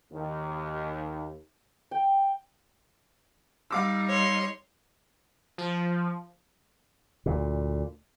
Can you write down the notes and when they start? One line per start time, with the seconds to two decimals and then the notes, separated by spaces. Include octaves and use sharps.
0.13 D#2
1.91 G5
3.71 G3 D#4 F5 D6 E6
4.08 C#5 C6
5.58 F3
7.26 D2 A#2